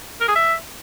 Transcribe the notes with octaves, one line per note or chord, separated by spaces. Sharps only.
A#4
G#4
E5